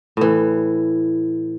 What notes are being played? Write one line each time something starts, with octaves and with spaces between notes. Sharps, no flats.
A2 E3